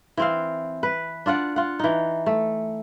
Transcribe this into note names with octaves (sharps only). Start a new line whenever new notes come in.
E3 C4 F5
B4
D4 F4 D5 F#5
F4 F#5
E3 D#4
A3